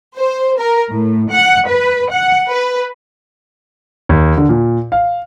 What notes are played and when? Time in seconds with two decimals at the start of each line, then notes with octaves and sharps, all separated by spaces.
0.16 C5
0.59 A#4
0.91 A2
1.31 F#5
1.70 B4
2.12 F#5
2.48 B4
4.09 D#2
4.37 D3
4.49 A#2
4.92 F5